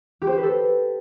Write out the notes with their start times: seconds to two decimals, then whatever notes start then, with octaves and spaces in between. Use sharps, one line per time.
0.22 G4
0.27 C5
0.32 G4
0.38 B4
0.43 A4